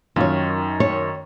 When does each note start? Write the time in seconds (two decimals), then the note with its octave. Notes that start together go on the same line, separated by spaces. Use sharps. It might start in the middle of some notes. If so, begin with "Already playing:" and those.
0.16 F#2 D#3 F4 C#5
0.80 C#5